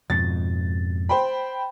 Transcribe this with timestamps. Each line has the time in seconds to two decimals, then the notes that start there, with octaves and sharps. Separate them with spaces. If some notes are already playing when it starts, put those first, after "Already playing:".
0.10 F2 G#2 B2 A6
1.09 C5 G5 B5